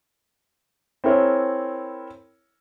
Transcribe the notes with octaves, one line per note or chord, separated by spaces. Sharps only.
C4 E4 G#4 A#4 C#5